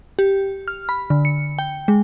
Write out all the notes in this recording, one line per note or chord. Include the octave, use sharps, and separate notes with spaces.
G4
F6
B5
D3
C#7
G5
G#3